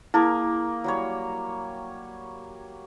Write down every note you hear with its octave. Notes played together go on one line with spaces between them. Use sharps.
A#3 E4 G#4 A#4
F#3 G3 C#5